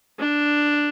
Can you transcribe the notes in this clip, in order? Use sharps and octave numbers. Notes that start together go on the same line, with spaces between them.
D4